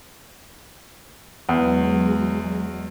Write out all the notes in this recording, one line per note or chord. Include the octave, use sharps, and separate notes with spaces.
E2 F#3 G#3